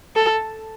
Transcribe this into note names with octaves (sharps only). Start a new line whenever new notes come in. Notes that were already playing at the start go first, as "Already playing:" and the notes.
A4